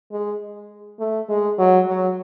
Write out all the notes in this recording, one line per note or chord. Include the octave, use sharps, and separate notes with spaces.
G#3
A3
G#3
F#3
F#3